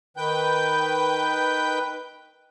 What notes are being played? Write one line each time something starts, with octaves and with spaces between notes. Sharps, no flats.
D#3 B4 G5 G6